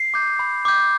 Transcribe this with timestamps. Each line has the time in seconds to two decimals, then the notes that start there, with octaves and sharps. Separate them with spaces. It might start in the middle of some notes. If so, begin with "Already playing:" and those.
Already playing: C7
0.14 D6 G6
0.39 B5
0.65 D6 G6